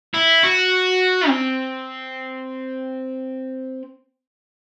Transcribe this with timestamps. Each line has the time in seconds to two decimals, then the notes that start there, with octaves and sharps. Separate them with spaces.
0.14 E4
0.43 F#4
1.28 C4